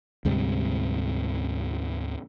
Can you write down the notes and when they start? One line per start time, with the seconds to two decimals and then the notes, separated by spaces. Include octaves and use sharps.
0.25 D2 G#2 C3 G3